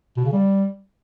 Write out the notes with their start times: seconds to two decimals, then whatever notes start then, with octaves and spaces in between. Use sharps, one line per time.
0.17 B2
0.25 C#3
0.33 G3